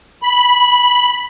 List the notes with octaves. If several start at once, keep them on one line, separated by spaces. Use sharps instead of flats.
B5